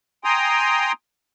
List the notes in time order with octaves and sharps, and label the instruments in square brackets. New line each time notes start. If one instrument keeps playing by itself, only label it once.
[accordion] G5 G#5 A#5 C6 D#6